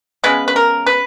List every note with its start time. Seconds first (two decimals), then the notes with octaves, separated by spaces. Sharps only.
0.24 C#3 G#3 B3 B4
0.48 B4
0.56 A#4
0.86 B4